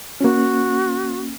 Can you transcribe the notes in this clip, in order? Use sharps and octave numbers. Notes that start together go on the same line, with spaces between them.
A#3 C#4 F#4